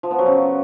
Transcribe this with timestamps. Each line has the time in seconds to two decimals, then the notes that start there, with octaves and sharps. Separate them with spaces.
0.03 F3
0.11 B3
0.19 F#3
0.26 C#3